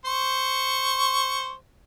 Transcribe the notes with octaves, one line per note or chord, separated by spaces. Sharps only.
C5 C#6